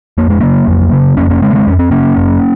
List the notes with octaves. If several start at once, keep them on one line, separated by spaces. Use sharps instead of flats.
F2 A#3
G#3
C#3 F#3 A#3
F2
C#3
F2 A#3 C#4
A#3 C#4
C#3 G#3 C4
A#3
G#3 C4
F2 C#4
C4
C#3 A#3 C#4
F#2